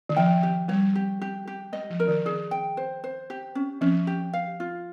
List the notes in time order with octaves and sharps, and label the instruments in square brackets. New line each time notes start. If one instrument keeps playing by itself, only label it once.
[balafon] D#3
[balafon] F3 [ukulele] G5
[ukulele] G4
[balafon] G3 [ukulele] C#5
[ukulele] G4
G4
G4
[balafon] G#3 [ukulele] D#5
[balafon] F3
[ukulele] A#4
[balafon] D#3
[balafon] D#3 [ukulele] G#4
[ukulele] G5
C5
C5
G4
C#4
[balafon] F3 [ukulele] C#4
[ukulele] G4
F5
F4